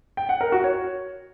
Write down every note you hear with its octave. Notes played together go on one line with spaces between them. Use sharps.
G5
F#5
A#4
F#4
C#5